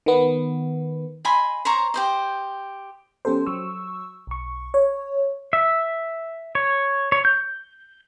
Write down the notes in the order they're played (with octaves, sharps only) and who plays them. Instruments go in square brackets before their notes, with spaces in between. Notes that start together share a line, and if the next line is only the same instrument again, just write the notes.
[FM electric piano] D#3 B3
[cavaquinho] D#5 G#5 B5 C6
C5 C#5 A#5
G4 C5 D#5
[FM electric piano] F3 B3 C#4 G4 A4 C5
F#3 C#6 E6
B1 C#6
C#5
[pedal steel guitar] E5
C#5
C#5
G6